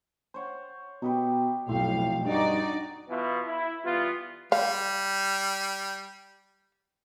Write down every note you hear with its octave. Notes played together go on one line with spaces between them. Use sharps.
C5 C#5 F#5
B2 D#4 G4 B4
B1 F2 A2 C4 F5
G2 D#4 F#4 D5 D6
B2 E3 B3 E4 F4
E4
E3 G3 B3 F4
G3 F5